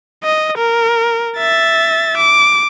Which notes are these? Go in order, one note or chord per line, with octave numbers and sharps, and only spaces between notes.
D#5
A#4
E5 A6
D6